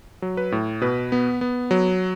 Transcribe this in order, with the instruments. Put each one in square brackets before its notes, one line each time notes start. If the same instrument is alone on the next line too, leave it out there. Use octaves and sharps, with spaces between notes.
[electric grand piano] F#3
B4
A2
B2 B4
B3
B3
F#3